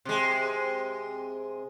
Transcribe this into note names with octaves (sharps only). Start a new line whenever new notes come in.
C3 G#3